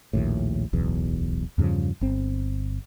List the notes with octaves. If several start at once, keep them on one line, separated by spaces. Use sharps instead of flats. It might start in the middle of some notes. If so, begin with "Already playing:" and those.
A#1 D#2 A2
D1 B1 E2
E2 G2 C#3 F3
G1 C4